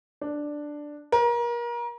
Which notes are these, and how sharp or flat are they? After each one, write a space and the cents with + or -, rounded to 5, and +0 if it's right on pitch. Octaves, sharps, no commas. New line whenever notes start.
D4 +5
A#4 +30